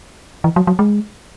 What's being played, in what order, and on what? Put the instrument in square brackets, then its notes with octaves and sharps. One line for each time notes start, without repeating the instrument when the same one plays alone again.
[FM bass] E3
F#3
F#3
G#3